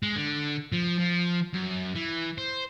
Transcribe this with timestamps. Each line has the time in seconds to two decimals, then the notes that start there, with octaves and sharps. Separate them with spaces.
0.03 G#3
0.16 D3
0.72 F3
0.99 F3
1.54 F#2
1.96 E3
2.38 C5